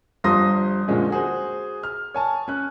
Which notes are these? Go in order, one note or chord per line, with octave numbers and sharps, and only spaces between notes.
G1 G2 F3 C6 D#6 A#6
A#2 D3 F3 G#3 C#4
F#4 G#4 C5
F6
C#5 G#5 A5
C#4 F#6